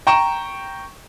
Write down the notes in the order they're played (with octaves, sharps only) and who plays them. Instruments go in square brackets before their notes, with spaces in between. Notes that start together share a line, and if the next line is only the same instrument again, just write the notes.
[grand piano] G5 A#5 C#6 E7